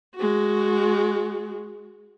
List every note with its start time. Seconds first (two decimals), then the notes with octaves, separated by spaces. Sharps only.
0.15 G#3 F#4